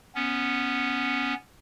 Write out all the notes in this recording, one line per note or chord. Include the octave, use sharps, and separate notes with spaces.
B3 C#4